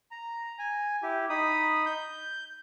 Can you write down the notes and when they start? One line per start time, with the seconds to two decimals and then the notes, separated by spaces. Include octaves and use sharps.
0.11 A#5
0.59 G#5
1.03 E4 G4
1.29 D#4 B5 D#6
1.86 G6